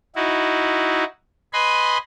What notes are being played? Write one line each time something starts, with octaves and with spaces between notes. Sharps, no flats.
D#4 E4 F#4
B4 D#5 G#5 B5 C6